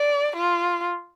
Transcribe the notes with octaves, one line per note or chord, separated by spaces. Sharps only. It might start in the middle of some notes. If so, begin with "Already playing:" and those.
Already playing: D5
F4